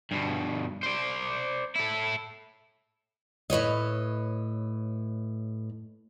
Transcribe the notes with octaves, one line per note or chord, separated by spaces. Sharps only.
G2 B2
C5 D5
E4 A4
A2 B4 C#5 D#5